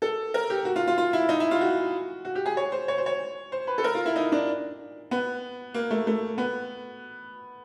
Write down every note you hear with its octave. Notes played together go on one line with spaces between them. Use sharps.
A4
A#4
G4
F#4
F4
F4
F4
E4
D#4
E4
F4
F#4
F#4
G4
G#4
C#5
C5
C#5
C5
C#5
C5
B4
A4
A#4
F4
E4
D#4
D4
B3
A#3
A3
A3
B3